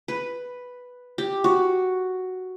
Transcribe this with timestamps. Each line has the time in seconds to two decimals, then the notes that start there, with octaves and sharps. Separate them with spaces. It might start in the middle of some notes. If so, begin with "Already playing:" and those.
0.08 B4
1.18 G4
1.44 F#4